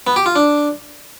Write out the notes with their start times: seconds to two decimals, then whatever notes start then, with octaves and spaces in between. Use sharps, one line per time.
0.07 B3
0.16 G4
0.26 F4
0.36 D4